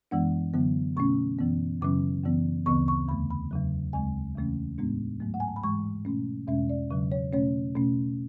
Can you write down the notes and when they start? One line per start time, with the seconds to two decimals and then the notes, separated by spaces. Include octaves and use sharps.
0.11 F#2 E3 G#3 B3 D4 F#5
0.54 F#2 D3 F#3 B3
0.97 B2 A3 C#4 C#6
1.39 F#2 E3 B3
1.82 F#2 C#3 F#3 C#4 D6
2.24 F#2 E3 B3
2.66 D2 C#3 E3 B3 C#6
2.88 C#6
3.08 E2 D3 A3 B5
3.30 B5
3.51 E2 C#3 F#3
3.93 D2 C#3 G#3 G#5
4.36 E2 C#3 E3 A3 C#4
4.78 A2 G#3 B3 D4
5.20 G#2 F#3 A3
5.34 F#5
5.40 G#5
5.48 A5
5.56 B5
5.63 G#2 E3 G#3 C#6
6.05 B2 A3 C#4
6.47 E2 B2 G#3 C#4 E5
6.70 D5
6.91 E2 C#3 F#3
7.12 C#5
7.33 B2 A3 C#4 C#5
7.76 B2 A3 C#4